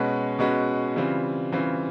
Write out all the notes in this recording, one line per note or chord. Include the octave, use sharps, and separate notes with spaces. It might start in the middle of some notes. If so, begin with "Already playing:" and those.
Already playing: B2 G#3 C#4 F#4 B4
B2 G#3 C#4 F#4 B4
C#3 E3 G3 C4 F4
C#3 E3 G3 C4 F4